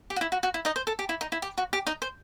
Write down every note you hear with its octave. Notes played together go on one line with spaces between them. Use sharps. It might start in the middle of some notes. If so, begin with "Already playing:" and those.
G4
F#4
E4
F#4
F#4
E4
D#4 D#5
C5
A4
G4
E4
D#4
E4
G4
F#4
G4
D#4 D#5
C5